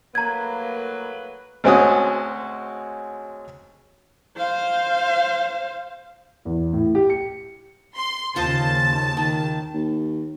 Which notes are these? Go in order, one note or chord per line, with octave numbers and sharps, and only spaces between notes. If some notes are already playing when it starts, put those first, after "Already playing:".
A2 F#3 A#3 B4 A#5 G#6
D2 G#3 C4 C#4 F#4 D#6
C5 F5
E2
A2
G4
C#7
C6
D#2 C#3 F4 C5 D#5 A5 A6
D#3
D#2